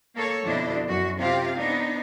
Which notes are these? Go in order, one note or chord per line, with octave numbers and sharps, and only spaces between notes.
A#3 A4 C#5
F2 B2 D3 D4 E4 D#5
F#2 F#4
C3 C4 F4 G4 F5
B3 D4 D#4